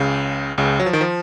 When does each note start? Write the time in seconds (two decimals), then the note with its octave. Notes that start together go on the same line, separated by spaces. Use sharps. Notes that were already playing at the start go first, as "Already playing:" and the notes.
Already playing: C#2 C#3
0.58 C#2 C#3
0.79 F#3
0.86 F3
0.93 D#3
1.01 F3